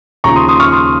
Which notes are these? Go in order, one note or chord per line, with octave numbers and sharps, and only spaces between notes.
D#2 C#3 F3 A#5 C#6
C6 D#6
C6 D#6
C#6 F6
C6 D#6